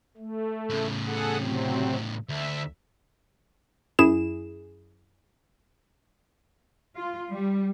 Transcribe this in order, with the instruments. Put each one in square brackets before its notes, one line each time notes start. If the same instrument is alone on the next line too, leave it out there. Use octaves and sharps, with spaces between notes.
[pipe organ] A3
[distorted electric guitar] A2 C#3
[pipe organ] G#4 A4 F#5
C3 F#3 C4
[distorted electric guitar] D2 [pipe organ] E5
[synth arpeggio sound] F#2 E4 G#4 E7
[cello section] F4
G3